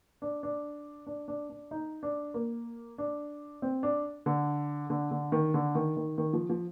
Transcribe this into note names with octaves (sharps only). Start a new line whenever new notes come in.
D4
D4
D4
D4
D4
D#4
D4
A#3
D4
C4
D4
D3
D3
D3
D#3
D3
D#3
D#3
D#3
F3
F3